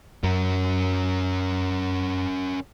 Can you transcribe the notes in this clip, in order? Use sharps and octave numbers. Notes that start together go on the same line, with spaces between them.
F#2 C#4 A#4